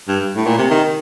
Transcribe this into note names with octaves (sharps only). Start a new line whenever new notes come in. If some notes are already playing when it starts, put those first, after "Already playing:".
G2
A2
A#2
C3
D#3